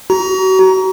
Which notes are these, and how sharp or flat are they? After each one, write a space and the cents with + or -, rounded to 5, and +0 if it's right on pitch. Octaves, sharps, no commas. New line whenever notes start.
F#4 +35 A#5 +10